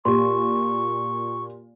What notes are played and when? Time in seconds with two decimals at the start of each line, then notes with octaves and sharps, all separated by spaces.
0.05 A#2 G4 C6 C#6